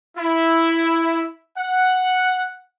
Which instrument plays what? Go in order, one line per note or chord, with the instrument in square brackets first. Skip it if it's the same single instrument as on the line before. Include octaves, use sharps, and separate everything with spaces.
[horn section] E4
F#5